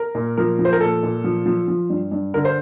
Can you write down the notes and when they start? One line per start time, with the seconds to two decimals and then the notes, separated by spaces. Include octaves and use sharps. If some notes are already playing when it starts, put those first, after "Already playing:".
Already playing: A#4
0.15 A#2
0.37 F3 A#4
0.59 F3
0.65 C5
0.73 A#4
0.81 A#2 A4
1.03 A#2
1.24 F3
1.46 F3
1.68 F3
1.90 G2
2.12 G2
2.34 D3 A#4
2.45 C5